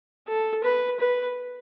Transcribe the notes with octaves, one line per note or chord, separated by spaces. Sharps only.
A4
B4
B4